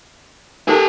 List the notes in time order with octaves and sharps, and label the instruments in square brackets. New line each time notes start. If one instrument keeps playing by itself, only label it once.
[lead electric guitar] G4 G#5 [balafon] A4 A#4 A5